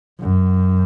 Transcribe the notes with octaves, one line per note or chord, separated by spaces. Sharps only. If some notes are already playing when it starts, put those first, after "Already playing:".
F#2